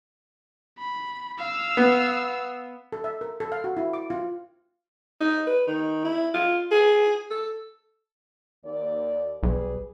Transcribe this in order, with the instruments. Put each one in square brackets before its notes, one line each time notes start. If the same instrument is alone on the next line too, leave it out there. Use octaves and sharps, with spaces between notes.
[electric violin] B5
F5 E6
[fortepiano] B3
[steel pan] A4
E5
A#4
A4
F5
F#4
E4
D6
F4
[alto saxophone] D#4
B4
D#3
E4
F4
G#4
A4
[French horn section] D#2 D5
[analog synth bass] B1 [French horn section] G3 G#4 B4